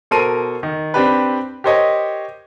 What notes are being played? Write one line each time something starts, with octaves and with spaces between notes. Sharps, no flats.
B2 A4 A#4 C5 C6 D#7
D#3
C4 D4 G4 B4
G4 A#4 C5 C#5 D#5